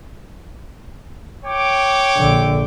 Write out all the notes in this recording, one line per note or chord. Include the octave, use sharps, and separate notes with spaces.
C#5 G5 D6
A#1 D3